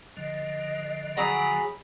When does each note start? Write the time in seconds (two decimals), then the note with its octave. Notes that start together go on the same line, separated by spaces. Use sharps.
0.17 D3 F3 D#5
1.17 F#3 G#4 A#5 B5